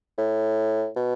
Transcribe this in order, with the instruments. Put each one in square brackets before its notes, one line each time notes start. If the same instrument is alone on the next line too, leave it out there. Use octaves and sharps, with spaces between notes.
[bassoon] A2
B2